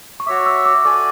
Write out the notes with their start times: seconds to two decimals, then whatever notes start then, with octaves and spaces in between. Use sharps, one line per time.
0.20 C#6
0.27 F#4 C#5 E5 D6
0.46 E6
0.66 D6
0.85 F#4 A4 D5 G#5 D6